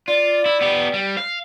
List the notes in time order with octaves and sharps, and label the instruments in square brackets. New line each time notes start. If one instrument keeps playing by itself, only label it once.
[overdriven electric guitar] F4 [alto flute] D5
[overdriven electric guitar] E4
B3 G4
G3
F5